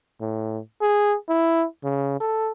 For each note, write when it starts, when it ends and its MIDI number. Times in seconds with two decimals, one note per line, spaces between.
0.20 0.59 45
0.81 1.16 68
1.29 1.65 64
1.84 2.18 49
2.20 2.52 69